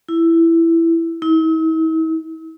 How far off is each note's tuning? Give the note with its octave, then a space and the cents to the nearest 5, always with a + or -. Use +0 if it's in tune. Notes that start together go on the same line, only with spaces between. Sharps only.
E4 +10
E4 -45